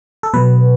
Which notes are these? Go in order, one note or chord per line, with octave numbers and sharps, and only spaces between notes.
A4
B2 F#3 B4